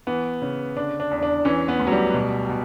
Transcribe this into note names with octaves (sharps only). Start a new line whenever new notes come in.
E3 B3
C#3
D3 D4
D4
E2
D4
E3 C#4
B3
D2
F#3
G3
B2
B2